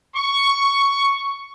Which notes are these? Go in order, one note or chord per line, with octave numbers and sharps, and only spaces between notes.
C#6